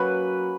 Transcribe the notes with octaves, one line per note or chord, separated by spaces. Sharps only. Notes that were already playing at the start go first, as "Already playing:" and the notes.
Already playing: F#3 A#3 C#4 B4